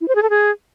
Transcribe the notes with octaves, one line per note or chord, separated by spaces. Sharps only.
E4
C5
G#4
A4
G#4